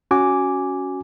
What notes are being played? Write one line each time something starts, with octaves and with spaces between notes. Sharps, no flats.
C#4 F#4 G#5 D6